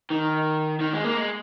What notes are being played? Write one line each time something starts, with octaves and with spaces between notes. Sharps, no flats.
D#3
D#3
G#3
A#3
G#3